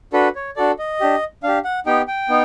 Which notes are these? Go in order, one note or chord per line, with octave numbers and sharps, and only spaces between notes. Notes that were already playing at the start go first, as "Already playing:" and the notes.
D4 F#4 A4 B4
C#5
D4 F#4 A4 D5
D#5
D4 G4
D4 G4 F5
F#5
B3 D#4 G4 G5
G5
B3 D#4